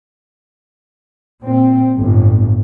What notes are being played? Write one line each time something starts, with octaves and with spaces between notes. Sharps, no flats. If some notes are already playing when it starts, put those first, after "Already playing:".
A#2 C4
G1 A2